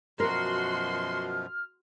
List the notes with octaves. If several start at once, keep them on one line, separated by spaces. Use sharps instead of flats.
F#2 B2 F3 F#4 A#4 C6 F6